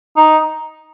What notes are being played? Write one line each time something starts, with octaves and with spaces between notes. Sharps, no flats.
D#4